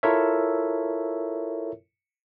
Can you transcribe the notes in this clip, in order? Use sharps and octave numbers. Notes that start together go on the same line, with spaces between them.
E4 F4 A4 A#4 C#5 E5